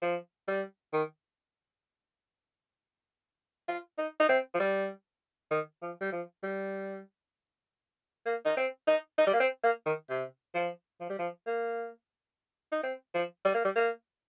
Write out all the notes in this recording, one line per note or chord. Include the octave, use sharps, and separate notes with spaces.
F3
G3
D#3
F4
D#4
D#4
C4
F3
G3
D#3
F3
G3
F3
G3
A#3
D#4
C4
D#4
D#4
G3
A#3
C4
A#3
D#3
C3
F3
F3
G3
F3
A#3
D#4
C4
F3
G3
A#3
G3
A#3